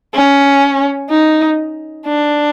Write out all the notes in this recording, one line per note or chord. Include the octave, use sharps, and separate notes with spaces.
C#4
D#4
D4